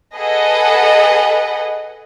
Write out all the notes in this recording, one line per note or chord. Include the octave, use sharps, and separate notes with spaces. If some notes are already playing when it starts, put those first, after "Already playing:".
G#4 A4 B4 D#5 F#5